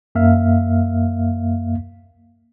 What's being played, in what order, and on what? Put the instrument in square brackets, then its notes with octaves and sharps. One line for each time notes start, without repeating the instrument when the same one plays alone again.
[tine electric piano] F#2 A#3 E5 F5 F6